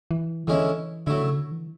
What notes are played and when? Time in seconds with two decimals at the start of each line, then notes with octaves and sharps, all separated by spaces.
0.11 E3
0.47 D3 E3 G#3 C#4 E4
1.06 D3 F#3 A3 E4
1.22 C#3
1.36 D3
1.52 E3